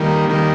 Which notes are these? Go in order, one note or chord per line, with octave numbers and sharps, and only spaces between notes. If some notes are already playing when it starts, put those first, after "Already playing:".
Already playing: D#3 G3 A#3
D#3 G3 A#3